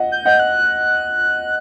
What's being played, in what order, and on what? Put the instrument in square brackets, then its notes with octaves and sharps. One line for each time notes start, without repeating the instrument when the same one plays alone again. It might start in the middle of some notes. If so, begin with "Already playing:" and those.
Already playing: [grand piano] D#5 F#5
[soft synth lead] G6
[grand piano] D#5 F#5
[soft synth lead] F#6